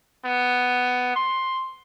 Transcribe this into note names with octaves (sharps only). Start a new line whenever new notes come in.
B3
C6